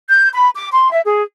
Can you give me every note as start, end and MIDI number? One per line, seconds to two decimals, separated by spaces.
0.10 0.29 91
0.34 0.50 83
0.56 0.69 86
0.72 0.90 84
0.91 1.00 76
1.05 1.22 68